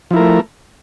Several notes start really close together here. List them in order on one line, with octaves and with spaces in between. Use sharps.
F3 E4 A#4 A3